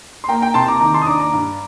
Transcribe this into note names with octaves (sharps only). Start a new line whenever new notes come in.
C6
A#3 G5 A#5
G5 A#5
C3 A5 C6
A#5 D6
D#3 A#5 D6
A5 C6
D#6
D4 A#5 D6
A#5 D6
G2